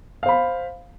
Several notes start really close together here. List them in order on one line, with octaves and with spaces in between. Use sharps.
F5 C5 B5